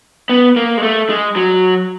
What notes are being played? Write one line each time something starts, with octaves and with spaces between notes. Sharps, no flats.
B3
A#3
G#3
A3
G#3
F#3